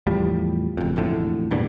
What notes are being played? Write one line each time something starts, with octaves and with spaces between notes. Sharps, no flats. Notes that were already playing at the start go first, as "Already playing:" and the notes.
E2 A2 F3 G3
F#1 F2
E1 F2 A2 D3
E2 G2 A#2 D3